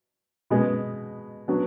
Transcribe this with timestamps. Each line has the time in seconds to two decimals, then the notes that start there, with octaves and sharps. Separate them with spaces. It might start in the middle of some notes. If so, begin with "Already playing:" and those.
0.50 B2 G#3 B3
1.48 F#3 B3 D4